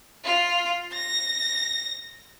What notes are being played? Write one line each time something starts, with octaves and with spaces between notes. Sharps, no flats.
F4
A#6